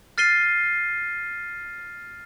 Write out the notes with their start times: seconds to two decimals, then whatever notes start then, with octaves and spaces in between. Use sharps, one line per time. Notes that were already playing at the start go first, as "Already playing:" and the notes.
0.18 F6 A6 C7 D#7 G7